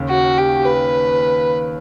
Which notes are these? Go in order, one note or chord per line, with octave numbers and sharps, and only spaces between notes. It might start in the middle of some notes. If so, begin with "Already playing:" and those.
Already playing: D#2 C#3 C#4
F#4
G4
B4